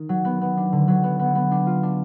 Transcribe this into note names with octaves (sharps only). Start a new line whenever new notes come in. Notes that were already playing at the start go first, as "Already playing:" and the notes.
Already playing: D#3
F#3
B3
B3
D4
D3
F#3
B3
B3
B3
D4
F4
D4